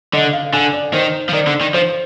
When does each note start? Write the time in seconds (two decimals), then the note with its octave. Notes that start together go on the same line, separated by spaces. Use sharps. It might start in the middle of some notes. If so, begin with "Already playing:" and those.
0.13 D3 D#5
0.33 F5
0.54 D3 G#5
0.73 D5
0.93 D#3 C5
1.29 F3
1.33 D#3 D5
1.47 D3
1.61 D#3
1.74 F3 C5